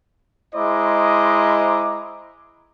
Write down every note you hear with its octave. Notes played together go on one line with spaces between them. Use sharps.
G#3 E4 C5 D#5 A#5 D6